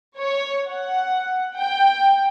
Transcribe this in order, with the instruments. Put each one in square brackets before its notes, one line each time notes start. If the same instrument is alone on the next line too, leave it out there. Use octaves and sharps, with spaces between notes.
[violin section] C#5
F#5
G5